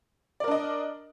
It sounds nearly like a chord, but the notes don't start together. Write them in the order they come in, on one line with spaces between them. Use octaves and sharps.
D5 A#4 D4 D#5